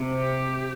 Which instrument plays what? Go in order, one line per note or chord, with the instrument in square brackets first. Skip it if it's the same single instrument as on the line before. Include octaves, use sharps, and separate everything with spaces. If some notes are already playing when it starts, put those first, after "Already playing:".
Already playing: [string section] C3
[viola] G4